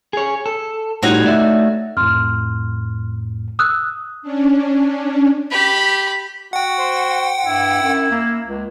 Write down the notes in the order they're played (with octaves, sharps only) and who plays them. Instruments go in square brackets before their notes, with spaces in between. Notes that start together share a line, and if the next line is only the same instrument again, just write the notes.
[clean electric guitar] G#4 C#5
A4
[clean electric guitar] A2 G3 F4 [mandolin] D#4 F#4 C#5
[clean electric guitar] A3 D5 E5
[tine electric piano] F2 A2 [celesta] C6 F6
[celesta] D#6 E6 F#6
[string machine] C#4 D4
[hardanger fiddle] G4 B5
[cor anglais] F#4 [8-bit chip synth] F#5 G5
[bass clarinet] C5
[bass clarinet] G2 [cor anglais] E4
[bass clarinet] F#2
A#3
C#2